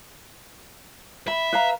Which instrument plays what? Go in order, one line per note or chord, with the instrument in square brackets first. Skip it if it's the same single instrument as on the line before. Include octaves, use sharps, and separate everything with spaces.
[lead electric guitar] E5 [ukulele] B5
[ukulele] B4 F5 A#5